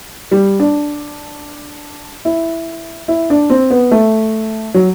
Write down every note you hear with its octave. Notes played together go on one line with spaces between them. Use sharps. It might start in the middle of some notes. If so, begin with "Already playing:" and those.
G3
D4
E4
E4
D4
C4
B3
A3
F#3